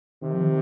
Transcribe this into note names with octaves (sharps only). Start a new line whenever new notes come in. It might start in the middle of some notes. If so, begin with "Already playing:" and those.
C3 D#3
F3
D#3